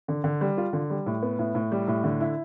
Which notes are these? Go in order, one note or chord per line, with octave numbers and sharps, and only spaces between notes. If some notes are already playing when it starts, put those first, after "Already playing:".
D3
D3
G3
F4
D3
G3
A2
B3
A2
A2
G3
A2
D3
E4